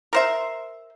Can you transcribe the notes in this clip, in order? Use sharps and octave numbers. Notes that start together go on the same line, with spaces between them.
A#4 C5 E5